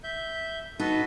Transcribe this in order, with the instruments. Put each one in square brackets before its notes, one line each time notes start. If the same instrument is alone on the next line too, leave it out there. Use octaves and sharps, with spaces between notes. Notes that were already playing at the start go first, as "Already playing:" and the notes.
[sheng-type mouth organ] E5 G6
[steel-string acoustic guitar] D#4 [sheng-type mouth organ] F#4 A4 B4